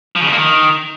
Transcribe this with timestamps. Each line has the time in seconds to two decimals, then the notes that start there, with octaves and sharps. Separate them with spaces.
0.16 F3
0.21 C#3
0.27 F2
0.32 A#3
0.38 D#3